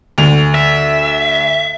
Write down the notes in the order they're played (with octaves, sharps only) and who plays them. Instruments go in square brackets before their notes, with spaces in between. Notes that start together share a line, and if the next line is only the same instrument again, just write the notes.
[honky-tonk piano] D2 F7
[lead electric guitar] E5